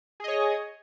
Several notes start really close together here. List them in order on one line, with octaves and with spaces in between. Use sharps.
G#4 D#5 C#5